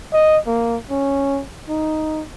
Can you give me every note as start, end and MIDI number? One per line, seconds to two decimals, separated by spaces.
0.14 0.38 75
0.47 0.77 58
0.90 1.42 61
1.68 2.23 63